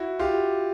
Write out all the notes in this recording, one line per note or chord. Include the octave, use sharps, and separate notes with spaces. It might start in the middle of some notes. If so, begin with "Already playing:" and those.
Already playing: E4 F#4
F4 G4